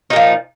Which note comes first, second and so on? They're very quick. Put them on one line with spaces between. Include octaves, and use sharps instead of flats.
D#4 A#2 F3